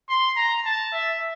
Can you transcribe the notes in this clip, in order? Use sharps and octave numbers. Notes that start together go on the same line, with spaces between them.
C6
A#5
A5
E5